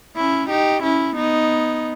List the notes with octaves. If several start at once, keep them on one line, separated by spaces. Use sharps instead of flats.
C#4 E4
D#4 G4
C#4 E4
B3 D#4